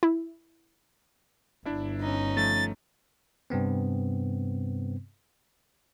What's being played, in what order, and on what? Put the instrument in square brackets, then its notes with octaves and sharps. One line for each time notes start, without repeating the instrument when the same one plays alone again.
[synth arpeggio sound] E4
[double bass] G1 [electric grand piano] D4 E4 E5
[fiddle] C#4 D#4
[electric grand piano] F3 A3 [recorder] A6
[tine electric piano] G2 C3 B3 C4